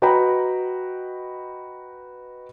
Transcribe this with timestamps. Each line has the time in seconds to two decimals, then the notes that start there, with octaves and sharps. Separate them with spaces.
0.02 F#4 B4 D#5 G5 A#5 B5